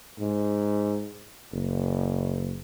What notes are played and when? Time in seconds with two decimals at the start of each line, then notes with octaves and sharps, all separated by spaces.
0.19 G#2
1.53 F#1